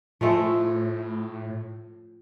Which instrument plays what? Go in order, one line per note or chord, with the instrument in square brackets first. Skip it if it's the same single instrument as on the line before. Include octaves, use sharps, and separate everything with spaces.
[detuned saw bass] A2 [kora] F3 G#3 A3